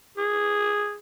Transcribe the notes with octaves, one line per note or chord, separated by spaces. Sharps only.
G#4